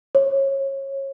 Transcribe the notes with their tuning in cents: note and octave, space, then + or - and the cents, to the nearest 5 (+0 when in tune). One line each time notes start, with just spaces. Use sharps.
C#5 -25